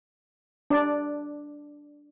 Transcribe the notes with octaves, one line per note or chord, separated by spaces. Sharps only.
D4 D5